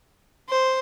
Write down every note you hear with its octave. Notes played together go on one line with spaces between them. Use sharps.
C5